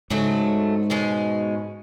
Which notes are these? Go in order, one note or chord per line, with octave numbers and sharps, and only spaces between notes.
G#2 C#3 F#3 A3
B2 G#3 C#4